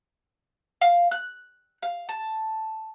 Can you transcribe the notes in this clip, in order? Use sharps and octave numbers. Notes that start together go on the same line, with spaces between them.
F5
F#6
F5
A5